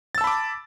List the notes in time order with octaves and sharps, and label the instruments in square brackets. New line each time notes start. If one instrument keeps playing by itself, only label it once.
[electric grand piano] A6
E6
A5
B5
D6